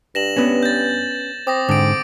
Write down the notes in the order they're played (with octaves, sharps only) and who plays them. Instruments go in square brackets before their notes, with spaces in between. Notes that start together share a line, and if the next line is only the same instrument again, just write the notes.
[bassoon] G2 [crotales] A#6 E7 F#7
[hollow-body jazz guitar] B3 C#4
[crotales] G6 A6
[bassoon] C4 [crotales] D6 D#6 A#6
[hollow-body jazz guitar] G#2 D3 [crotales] D6 D7